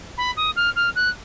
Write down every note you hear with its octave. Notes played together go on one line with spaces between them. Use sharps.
B5
D#6
F6
F6
F#6